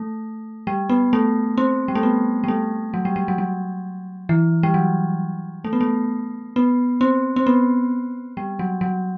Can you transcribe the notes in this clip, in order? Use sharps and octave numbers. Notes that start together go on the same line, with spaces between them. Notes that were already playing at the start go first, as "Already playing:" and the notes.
Already playing: A3
G3
B3
A3
C4
G3
A3
B3
G3
A3
F#3
G3
G3
F#3
F#3
E3
G3
F#3
A3
B3
A3
B3
C4
C4
B3
G3
F#3
F#3